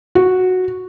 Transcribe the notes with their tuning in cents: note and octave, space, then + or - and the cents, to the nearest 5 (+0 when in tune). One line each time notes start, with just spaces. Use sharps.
F#4 -5